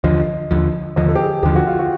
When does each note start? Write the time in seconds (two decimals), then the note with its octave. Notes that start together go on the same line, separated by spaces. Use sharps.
0.04 D#2 D3 F3 D#5
0.51 D#2 D3 F3
0.96 D#2 D3 F3 D#5
1.08 A4
1.15 G4
1.21 G#4
1.43 D#2 D3 F3 G4
1.55 F#4
1.67 F4
1.79 F#4